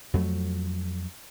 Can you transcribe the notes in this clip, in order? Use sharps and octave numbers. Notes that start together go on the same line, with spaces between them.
F2 F#3 G3 A3